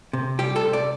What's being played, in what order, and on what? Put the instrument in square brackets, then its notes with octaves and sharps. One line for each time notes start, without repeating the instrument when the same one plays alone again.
[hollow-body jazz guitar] C3
G3 G4
A4
C3
D5